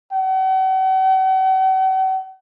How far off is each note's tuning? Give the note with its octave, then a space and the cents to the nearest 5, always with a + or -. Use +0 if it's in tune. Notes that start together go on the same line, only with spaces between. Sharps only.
F#5 +45